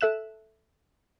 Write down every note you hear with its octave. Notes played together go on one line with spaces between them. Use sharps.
A4 E5 F#6 E7